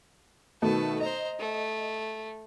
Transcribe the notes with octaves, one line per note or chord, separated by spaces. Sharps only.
B2 D#3 A3 B4 A5
C5 D#5 A#5
A3